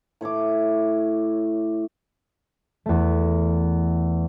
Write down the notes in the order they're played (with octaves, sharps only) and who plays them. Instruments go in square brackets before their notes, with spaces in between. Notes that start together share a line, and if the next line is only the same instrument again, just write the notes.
[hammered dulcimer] A2 C#5 E5 D6
[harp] E2 A3